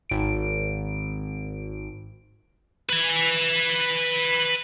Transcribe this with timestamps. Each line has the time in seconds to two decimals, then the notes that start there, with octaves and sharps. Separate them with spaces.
0.10 G#1 D7
2.90 B4 G#5